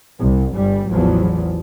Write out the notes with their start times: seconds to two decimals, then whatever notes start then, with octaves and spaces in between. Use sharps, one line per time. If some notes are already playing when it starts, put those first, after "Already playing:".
0.20 C2
0.56 G1 G3
0.91 A1 E2 F3 F#3